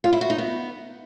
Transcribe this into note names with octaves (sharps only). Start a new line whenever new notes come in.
F4
E4
F#4
D#4
B3